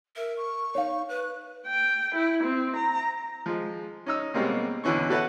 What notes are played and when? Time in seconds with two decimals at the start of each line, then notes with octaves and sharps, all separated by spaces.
0.16 A#4 E5
0.37 C#6
0.75 D#4 C#5 F5
1.09 B4 F#6
1.67 G5
2.15 E4
2.44 C4
2.76 A#5
3.46 F3 G#3
4.06 C#4 D#4 E6
4.34 B2 G3 G#3 A#3 C4 C#4
4.84 E2 B2 D3 E3 C#4 C#6
5.10 F#4 A4 B4 C#5 E5 F#5